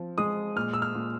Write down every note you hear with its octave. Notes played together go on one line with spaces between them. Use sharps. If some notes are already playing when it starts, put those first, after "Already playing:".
Already playing: F3 C4
G#3 D#6
A#2 F6
E6
F6
A#2